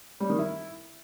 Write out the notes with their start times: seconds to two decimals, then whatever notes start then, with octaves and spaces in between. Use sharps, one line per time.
0.20 G3
0.30 D#3
0.39 E4